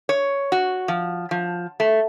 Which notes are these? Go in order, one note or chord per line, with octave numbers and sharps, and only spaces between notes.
C#5
F#4
F3
F3
A3